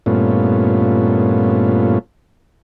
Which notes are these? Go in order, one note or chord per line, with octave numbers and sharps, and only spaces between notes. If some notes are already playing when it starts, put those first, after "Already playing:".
G2 A#2 A3 B3 C#4 F4